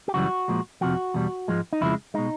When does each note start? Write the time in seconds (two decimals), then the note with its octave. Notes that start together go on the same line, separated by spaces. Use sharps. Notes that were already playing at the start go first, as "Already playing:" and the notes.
0.08 G4
0.14 F#2 C#3 E3 G3 F#4
0.48 A#2 F3 G#3
0.81 F2 C3 F3 F#4
1.14 E2 B2 G3
1.48 G#2 F3 G#3
1.73 D#4
1.81 F2 C#3 F3 G#3 E4
2.14 B2 G#3 D#4